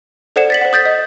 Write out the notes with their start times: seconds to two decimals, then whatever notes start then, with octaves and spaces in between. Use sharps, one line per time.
0.36 A4 C5 D5 F#5 C#7 E7
0.50 A6 B6 F#7
0.61 C5 F#5
0.73 D#6 G6 A6 B6
0.86 D#5